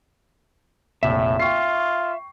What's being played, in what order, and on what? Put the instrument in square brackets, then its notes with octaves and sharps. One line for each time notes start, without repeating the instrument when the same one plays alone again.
[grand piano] F1 A#1 [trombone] A2 [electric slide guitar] E5
[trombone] F4 [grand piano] G5 C#6 C7